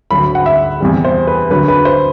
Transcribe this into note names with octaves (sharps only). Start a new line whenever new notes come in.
D2 D3 F#3 B5
F#5
E5
E2 C3 E3 G3
C5
B4
D2 D3 F#3 B4
B4
C5